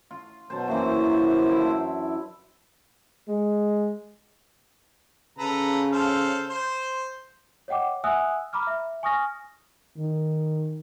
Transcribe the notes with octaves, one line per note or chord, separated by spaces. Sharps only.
F4
B2 F#3 C5 A5
F#2 C3 E3 A#3 C5
D4 E4 E5
G#3
C#3 A4 B4 A#5
A4 C5 F5
C5
C#5 D#5 F#5 G5 D6
E5 F#5 G#5 D#6 E6 F#6
A#5 B5 D6 F6
E5
G#5 C#6 D#6 F6 A#6
D#3